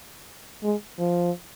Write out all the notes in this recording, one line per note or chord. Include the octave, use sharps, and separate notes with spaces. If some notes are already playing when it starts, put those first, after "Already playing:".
G#3
F3